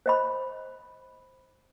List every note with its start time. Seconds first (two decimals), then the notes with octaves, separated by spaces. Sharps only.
0.06 C5 D#5 B5